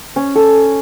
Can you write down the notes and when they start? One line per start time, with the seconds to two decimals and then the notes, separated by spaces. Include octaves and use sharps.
0.16 C#4
0.35 A4